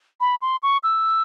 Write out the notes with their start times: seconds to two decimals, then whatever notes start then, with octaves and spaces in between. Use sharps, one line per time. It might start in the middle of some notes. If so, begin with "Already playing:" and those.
0.21 B5
0.42 C6
0.63 C#6
0.83 E6